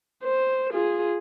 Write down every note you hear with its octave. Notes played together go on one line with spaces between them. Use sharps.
C5
F4 G#4